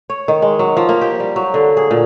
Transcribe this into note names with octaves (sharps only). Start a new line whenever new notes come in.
C#5
D#3
G#3
F#3
F3
A#3
G4
G3
F#3
D3
G#4
A#2